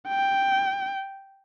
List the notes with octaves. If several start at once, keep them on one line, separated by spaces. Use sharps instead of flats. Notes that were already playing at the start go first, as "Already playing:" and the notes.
G5